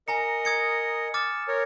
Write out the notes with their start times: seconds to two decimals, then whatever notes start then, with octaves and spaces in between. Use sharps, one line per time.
0.08 A#4 D#5 G#5 A#5 C#7
0.45 D#6 G#6 C#7
1.14 D6 E6 F6 A6
1.48 A#4 C#5